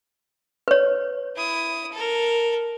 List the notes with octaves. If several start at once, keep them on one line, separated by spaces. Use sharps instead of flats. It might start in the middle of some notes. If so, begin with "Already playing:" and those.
B4 C#5
E4 D#6
A4 A#4